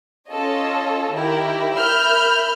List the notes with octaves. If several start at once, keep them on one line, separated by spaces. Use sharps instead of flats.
C#4 F4 A4 C#5 D#5
D#3 E4 G4 A#4
A#4 E5 B5 F6 G6